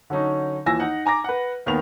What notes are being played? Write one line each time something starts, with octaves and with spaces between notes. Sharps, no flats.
D3 F#3 C#4 D#4
D#2 E3 F3 G#5 E6 A#6
D#4 F#5
G#5 A#5 D6 A#6
B4 F#5
D#2 D#3 B3 F7